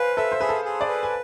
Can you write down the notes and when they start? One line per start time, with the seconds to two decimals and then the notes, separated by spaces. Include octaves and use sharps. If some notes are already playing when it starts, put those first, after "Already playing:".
Already playing: B4 C5 F5 G#5
0.17 A4 E5
0.32 C5
0.40 G#4 B4
0.49 A4
0.65 G#4
0.81 D5
0.88 B4
1.03 G#5